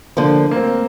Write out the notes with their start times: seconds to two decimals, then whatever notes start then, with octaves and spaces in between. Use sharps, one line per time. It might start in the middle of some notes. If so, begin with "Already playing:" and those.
0.17 D3 F3 A#3
0.51 A#3
0.56 C4